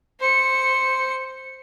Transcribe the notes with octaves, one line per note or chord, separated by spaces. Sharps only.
C5 C#7